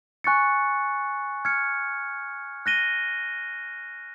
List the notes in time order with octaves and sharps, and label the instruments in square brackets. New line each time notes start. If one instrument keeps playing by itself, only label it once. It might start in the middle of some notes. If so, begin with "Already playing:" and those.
[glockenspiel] G#5 C#6 F#6 A6 C#7
F6 G#6 C#7
F#6 A#6 D#7 G7